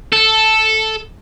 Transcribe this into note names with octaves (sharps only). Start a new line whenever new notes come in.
A4